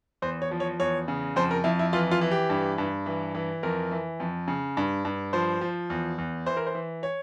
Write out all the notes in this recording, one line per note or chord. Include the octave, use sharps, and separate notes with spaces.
E2 C5
C#5
F3
C#5
E2 C#5
C#3
F2 C5
A#4
F2 E4
E4
E3 F4
F4
E3
G4
G2
G2
E3
E3
F2 A#4
E3
F2
C#3
G2
G2
F3 C5
F3
E2
E2
E3 C5
A#4
C5
E3
C#5